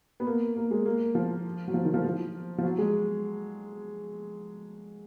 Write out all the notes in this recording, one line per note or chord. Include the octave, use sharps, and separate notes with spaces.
B3
A#3
A#3
G#3
A#3
F3
F#3
F3
D#3
F3
F3
F3
F#3
G#3